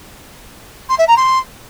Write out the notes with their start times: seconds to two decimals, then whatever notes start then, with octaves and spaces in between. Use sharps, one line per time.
0.89 C6
0.99 E5
1.08 A#5
1.17 C6